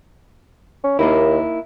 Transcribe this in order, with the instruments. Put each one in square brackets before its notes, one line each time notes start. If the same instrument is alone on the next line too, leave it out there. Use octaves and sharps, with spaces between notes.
[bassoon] C#4
[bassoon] D#2 [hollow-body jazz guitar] A#3 D#4 E4